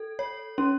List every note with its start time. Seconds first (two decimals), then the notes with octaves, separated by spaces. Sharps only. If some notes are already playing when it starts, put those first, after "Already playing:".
Already playing: A4
0.19 C#5
0.58 C#4